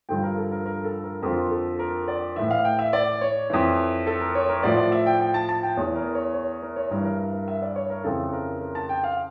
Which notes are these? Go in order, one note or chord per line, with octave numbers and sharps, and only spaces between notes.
G2 D3 F3 G5
A#4
A4
A#4
A#4
A4
A#4
F2 D3 F3 A#4
A4
A#4
D5
A2 E3 E5
F5
G5
E5
D5
C#5
F2 E3
A4
A#4
C#5
A#4
A2 F3 D5
D5
E5
G5
G5
A5
A5
G5
E2 E3 C#5
A#4
C#5
C#5
A#4
C#5
G2 E3 A#4
A#4
A#4
A#4
E5
D5
C#5
A#4
F2 C#3 E3 A4
A#4
A#4
A5
G5
F5